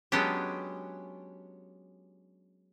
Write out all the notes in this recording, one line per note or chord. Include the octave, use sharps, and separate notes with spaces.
F#3 G#3 B3 C#4 D4 G4